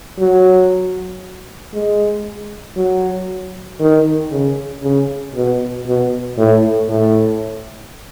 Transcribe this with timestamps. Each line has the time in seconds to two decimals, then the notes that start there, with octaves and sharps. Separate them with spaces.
0.19 F#3
1.74 G#3
2.76 F#3
3.80 D#3
4.31 C#3
4.83 C#3
5.35 B2
5.86 B2
6.38 A2
6.89 A2